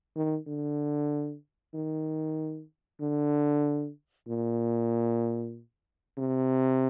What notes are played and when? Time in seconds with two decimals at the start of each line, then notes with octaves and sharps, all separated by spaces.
0.16 D#3
0.47 D3
1.74 D#3
3.01 D3
4.28 A#2
6.18 C3